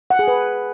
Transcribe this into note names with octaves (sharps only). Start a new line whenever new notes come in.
F#5
G#4
B4